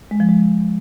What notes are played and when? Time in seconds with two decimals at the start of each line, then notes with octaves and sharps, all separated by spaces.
0.11 G#3
0.20 F3
0.29 G#3